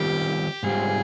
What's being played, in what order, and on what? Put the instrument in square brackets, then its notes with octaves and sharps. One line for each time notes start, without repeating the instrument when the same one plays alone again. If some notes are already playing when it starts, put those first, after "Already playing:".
Already playing: [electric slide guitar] D#3 G3 C4 F4 [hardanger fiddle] G4
[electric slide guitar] G#2 G3 C4 F4 [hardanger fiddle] G#4